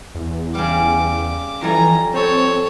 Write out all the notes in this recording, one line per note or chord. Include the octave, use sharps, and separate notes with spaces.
E2
C#3 G3 D6
F2 E3 G3 G#5 A#5
C4 A4 C#5